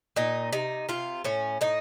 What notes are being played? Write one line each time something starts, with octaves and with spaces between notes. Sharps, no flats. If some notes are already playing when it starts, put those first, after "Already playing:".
A#2 D#4
C3 D#4
C3 F4
A2 C#4
A2 D#4